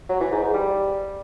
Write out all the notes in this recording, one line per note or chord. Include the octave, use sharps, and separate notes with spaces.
F#3
E3
G#2
G#2
G3